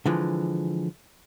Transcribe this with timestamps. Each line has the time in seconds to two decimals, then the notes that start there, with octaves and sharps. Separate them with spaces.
0.06 D3 E3 F3 G#3